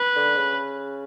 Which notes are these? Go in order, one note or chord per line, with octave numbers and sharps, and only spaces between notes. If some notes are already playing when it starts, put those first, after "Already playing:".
Already playing: B4
D3
C#3